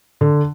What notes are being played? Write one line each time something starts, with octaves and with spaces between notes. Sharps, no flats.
D3